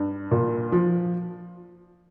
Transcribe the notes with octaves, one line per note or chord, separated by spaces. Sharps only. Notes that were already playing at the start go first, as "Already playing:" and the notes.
Already playing: G2
A#2
F3